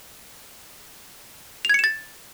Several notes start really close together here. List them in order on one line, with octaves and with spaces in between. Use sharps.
F7 G#6 C#7 E7 A6